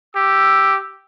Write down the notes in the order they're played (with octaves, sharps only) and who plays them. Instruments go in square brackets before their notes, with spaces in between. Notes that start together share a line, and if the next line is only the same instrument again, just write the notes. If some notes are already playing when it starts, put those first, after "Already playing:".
[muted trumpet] G4 [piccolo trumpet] E6